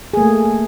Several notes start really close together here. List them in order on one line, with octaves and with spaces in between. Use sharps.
G#4 A#3 A3